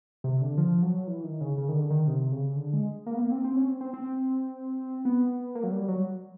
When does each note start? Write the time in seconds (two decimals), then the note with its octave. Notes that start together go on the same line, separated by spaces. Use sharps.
0.24 C3
0.41 D3
0.58 F3
0.83 F#3
1.07 E3
1.24 D#3
1.41 C#3
1.58 C#3
1.69 D#3
1.74 D3
1.90 D#3
2.07 C3
2.32 C#3
2.56 D3
2.73 G#3
3.06 A#3
3.14 B3
3.21 A#3
3.31 C4
3.44 C4
3.56 C#4
3.69 C4
3.81 C4
3.93 C4
5.05 B3
5.55 A#3
5.63 F#3
5.72 G3
5.88 F#3